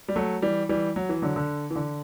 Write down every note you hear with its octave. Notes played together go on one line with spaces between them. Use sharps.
G3
F#3 A3
E3 G3
E3 G3
F#3
E3
D3 F#3
D3
E3
D3